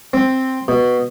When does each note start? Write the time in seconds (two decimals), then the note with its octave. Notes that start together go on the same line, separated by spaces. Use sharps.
0.13 C4
0.68 B2